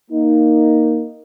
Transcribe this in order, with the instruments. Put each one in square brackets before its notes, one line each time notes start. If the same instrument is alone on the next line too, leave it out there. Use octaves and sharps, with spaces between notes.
[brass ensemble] A#3 D#4